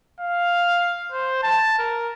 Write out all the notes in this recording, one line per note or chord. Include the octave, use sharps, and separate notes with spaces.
F5
C5
A5
A#4